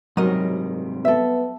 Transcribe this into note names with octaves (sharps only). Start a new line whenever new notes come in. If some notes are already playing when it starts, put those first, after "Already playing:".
G#2 C3 F#3 G3 A#4 D#5
B3 A4 E5